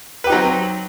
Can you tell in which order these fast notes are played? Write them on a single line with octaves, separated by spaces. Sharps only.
B4 G4 D#4 F#3 C4